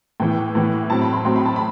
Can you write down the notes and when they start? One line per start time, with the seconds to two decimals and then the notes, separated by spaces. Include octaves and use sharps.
0.20 A2 E3 B3 G5
0.55 A2 E3 B3
0.90 A2 F#3 C4 A5
1.02 B5
1.13 C6
1.25 A2 F#3 C4 C6
1.36 B5
1.46 A5
1.56 B5